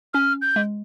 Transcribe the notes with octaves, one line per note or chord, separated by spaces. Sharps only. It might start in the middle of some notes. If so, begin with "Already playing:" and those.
C#4 F6
G6
G#3